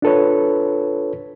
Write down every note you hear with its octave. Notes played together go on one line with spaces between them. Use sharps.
D4 F4 A4 B4 C#5